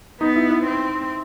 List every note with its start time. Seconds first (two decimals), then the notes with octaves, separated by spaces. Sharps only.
0.21 B3 D#4
0.36 E4
0.50 E4
0.66 C4